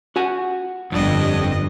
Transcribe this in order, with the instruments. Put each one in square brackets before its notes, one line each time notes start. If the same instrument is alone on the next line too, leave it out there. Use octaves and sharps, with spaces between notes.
[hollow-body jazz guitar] F#4 F#5 G#5
[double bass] G1 G3 [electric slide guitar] F2 [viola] D4 D#5